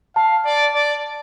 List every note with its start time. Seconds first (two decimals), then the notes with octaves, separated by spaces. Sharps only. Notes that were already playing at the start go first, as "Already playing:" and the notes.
0.16 F5 A5
0.45 D5
0.74 D5